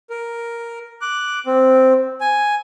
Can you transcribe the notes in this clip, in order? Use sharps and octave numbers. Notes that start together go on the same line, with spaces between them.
A#4
D6 F#6
C4
G#5